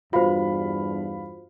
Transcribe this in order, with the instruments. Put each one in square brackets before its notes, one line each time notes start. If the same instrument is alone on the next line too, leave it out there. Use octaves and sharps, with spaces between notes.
[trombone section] E2 G2 [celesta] F4 F#4 C5 [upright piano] F5 B5